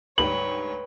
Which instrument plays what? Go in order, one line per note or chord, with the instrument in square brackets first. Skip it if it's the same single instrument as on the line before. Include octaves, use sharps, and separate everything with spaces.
[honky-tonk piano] D2 G#2 G3 [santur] B4 G5 [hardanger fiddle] C#5 [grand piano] F#7